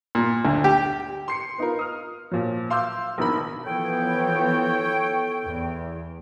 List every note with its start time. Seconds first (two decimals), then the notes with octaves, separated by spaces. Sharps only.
0.15 A#2
0.45 D2
0.64 G4
1.28 C6 C7 C#7
1.58 B3 D#4 F4 A#4
1.79 D#6 F6
2.32 A#2 F3 F#3
2.70 F5 C6 D6 E6 G6
3.18 A#1 B2 D#3 A#4 B5
3.66 E3 F3 B3 A4 C#5 G5
5.45 E2